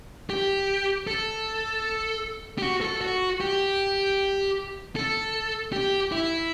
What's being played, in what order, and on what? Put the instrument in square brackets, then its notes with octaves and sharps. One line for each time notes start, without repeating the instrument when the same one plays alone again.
[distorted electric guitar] G4
A4
G4
F#4
A4
F#4
G4
A4
G4
E4